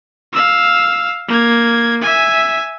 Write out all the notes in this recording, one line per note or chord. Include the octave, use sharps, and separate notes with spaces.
F5 E6
A#3 G#6
E5 G#5